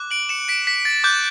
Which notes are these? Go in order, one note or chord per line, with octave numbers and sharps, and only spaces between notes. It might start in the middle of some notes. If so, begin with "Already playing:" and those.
Already playing: D6 F#6
D7 F#7
C#7 E7
B6 D7
B6
A6
D6 F#6 G6